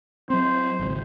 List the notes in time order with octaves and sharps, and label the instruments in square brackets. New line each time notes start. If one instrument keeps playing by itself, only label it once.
[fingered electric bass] F#3 C4 [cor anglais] C5
[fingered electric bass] G#1 C#2